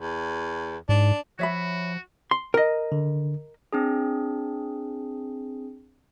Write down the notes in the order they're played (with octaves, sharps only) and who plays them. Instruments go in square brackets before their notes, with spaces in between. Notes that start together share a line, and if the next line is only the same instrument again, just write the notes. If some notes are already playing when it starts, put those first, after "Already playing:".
[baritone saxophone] E2
[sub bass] G#2 [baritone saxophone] D4
[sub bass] F3 [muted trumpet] F#4 [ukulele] C#5 E5 B5
[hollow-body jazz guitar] C6
A#4 D#5
[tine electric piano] D3
[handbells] C4 D4 G#4